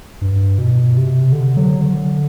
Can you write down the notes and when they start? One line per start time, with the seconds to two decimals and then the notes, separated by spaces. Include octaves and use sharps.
0.22 G2
0.58 B2
0.96 C3
1.32 D3
1.57 F#3
1.81 D3